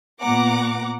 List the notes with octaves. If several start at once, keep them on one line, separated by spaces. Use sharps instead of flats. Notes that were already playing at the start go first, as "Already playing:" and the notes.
A#2 B3 F#5 A#5 D6